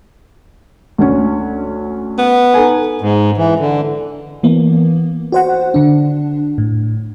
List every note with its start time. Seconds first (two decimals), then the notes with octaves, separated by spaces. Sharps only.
0.98 D2 C#4
2.19 B3
2.54 D#4 A4 G#5
3.01 G#2
3.37 E3
3.59 D3
4.43 E3 A#3 B3
5.32 F#4 C5 F#5
5.74 D3 D4
6.58 A2